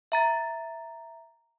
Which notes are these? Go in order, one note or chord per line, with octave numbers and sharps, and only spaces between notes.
E5 A#5 A6